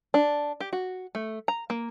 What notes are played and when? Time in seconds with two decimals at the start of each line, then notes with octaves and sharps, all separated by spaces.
0.14 D4
0.60 G4
0.73 F#4
1.15 A3
1.48 A#5
1.70 A#3